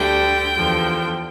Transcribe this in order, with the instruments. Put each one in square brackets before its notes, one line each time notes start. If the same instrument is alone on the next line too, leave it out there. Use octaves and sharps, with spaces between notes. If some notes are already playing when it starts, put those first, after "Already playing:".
Already playing: [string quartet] D2 D3 G3 G5
E2 D3 F3